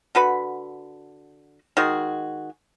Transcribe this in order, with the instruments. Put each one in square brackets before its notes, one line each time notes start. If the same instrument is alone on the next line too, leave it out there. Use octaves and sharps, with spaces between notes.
[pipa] D3 F#4 B4 B5
D#3 G#3 F#4 G#4